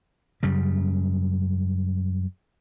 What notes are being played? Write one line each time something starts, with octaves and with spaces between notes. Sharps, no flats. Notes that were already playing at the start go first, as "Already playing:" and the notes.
F#2 C#3 G3